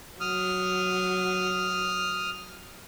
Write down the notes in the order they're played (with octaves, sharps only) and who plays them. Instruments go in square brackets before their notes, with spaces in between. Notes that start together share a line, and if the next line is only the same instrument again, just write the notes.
[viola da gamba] F#3 [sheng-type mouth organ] D#6 F6